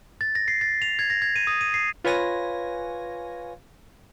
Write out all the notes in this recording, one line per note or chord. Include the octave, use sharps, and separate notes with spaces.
A6
A#6
C7
A6
F7
G#6
A#6
G#6
D#7
D#6
D#7
C7
F4 B4 C#5 G#5 A#6